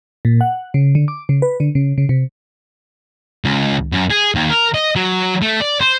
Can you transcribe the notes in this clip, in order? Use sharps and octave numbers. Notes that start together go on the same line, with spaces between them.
A#2
F#5
C#3
D3
D6
C#3
B4
D3
C#3
C#3
C3
C#2
F#2
G#4
D#2
A#4
D#5
F#3
A3
D5
C5